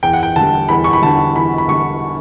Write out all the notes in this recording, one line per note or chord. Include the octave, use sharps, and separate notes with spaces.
E2 G5
F#5
G5
D3 G3 A5
E2 B5
C#6
B5
D3 G3 A5
E2 B5
B5
D3 G3 C#6